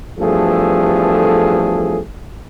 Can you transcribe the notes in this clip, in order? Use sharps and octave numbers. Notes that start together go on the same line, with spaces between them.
E2 G2 F3 A3 G#4 A4